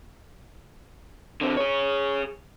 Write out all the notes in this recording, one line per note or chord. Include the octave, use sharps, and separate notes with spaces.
D3 C4
G#4 C#5